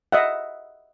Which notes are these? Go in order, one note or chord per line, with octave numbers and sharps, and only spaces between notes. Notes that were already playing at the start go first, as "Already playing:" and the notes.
D#5 E5 F#5